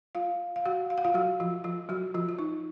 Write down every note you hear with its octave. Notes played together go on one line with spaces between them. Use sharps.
F4 F5
F5
F#4 F#5
F5
F#5
F4 F5
F#3 F#4
F3 F4
F3 F4
F#3 F#4
F3 F4
F4
D#4